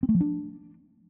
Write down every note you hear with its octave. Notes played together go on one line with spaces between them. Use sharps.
C4
A3
F3
D4